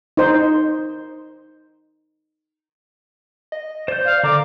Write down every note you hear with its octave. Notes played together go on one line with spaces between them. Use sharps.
D#4 C5
D#5
C5 D5 G6
F5
D3 A#4 D5 A#5 D6